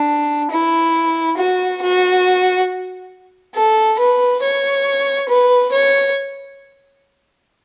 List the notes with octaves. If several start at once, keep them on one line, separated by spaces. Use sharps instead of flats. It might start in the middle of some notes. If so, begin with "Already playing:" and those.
Already playing: D4
E4
F#4
F#4
A4
B4
C#5
B4
C#5